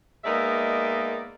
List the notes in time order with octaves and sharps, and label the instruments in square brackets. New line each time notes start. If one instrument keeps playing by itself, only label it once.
[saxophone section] G#3 A#3 B3 D#4 D5 E5